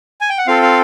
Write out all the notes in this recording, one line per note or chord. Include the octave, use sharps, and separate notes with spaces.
G#5
G5
F#5
C4 F4 A4 F5
F5